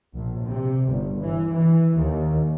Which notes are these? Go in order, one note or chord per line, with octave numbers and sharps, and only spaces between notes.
A#1
C3
G1
E3
E3
D#2